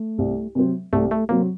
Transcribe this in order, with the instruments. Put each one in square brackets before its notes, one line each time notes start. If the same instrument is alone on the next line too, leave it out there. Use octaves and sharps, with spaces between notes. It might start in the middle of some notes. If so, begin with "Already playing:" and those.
Already playing: [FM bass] A3
[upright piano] C2
C3 F#3 C4
[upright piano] C2 [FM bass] A3
[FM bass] A3
[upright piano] C3 F#3 C4 [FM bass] A#3